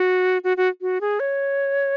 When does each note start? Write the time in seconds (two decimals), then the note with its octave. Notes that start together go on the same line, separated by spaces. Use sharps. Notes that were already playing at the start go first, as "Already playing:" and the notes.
Already playing: F#4
0.44 F#4
0.57 F#4
0.81 F#4
1.01 G#4
1.20 C#5